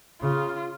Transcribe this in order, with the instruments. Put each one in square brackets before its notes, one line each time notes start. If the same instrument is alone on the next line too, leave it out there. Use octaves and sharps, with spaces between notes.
[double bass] C#3 [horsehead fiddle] F4